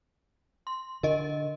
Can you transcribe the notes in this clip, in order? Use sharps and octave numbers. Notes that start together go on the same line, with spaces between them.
C6
D3 A#4 D#5